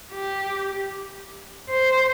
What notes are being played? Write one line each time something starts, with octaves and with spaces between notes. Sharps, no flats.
G4
C5